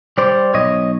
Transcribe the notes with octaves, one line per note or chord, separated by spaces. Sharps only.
G3 C5 D5
B1 C#5 D#5